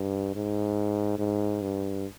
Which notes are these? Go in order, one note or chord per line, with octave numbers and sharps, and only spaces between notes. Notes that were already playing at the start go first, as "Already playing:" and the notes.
Already playing: G2
G#2
G#2
G2